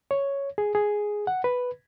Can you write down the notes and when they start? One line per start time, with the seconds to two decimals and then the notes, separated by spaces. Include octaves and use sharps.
0.11 C#5
0.58 G#4
0.75 G#4
1.27 F#5
1.44 B4